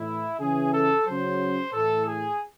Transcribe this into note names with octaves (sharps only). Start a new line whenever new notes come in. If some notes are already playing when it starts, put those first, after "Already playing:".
Already playing: A2 E3 E4
C#3 E3 G#4
A4
C#3 F#3 C5
A2 E3 A4
G#4